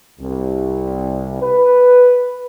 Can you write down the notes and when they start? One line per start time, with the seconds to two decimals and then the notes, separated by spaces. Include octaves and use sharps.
0.20 C2
1.42 B4